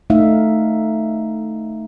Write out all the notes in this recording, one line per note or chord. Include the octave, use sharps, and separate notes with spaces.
A3 D#4 E5 F5